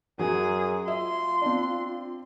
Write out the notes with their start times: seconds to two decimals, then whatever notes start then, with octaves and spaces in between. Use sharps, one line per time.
0.19 F#2 F#3 G#4
0.88 F4 E5 C6
1.42 C4 D4